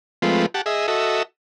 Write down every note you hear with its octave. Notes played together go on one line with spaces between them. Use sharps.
F3 G#3 A3 C4 F4 B4
G4 F#5 A5
G#4 D#5 E5
F#4 A4 D#5 E5